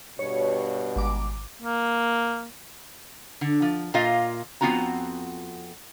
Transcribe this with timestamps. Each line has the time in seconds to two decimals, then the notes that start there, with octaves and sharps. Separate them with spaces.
0.19 G2 B2 C#5
0.96 G#1 D6
1.62 A#3
3.41 D3
3.62 F3
3.94 A#2 F4 D#5 F5
4.61 F2 B3 C4 F4 F#4 A#5